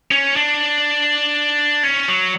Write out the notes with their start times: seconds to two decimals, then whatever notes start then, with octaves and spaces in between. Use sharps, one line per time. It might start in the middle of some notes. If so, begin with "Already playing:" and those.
0.11 C#4
0.36 D4
1.83 C#4
2.08 F#3